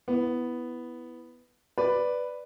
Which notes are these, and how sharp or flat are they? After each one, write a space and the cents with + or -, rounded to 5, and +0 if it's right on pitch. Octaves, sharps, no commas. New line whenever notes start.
B3 +0 E4 +0
B4 +0 D5 +0